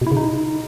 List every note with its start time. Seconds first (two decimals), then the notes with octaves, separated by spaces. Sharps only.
0.01 B2
0.07 E4
0.12 C#3
0.17 D#4